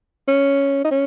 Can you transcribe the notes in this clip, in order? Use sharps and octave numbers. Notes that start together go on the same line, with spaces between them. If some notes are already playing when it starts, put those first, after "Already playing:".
C#4
D#4
C#4